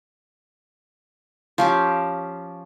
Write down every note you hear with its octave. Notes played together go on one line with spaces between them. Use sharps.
F3 C#4 G4